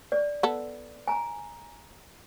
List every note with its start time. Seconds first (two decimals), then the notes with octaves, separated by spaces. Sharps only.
0.12 D5
0.43 B3 A4
1.08 G#5 A#5